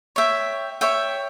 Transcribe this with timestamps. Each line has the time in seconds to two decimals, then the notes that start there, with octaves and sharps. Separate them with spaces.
0.16 C#5 E5 G5
0.81 C#5 E5 G5